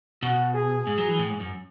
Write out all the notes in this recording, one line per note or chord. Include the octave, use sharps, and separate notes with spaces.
B2 F#4
G#4
G#2
F#3
E3
A2
G#2
F#2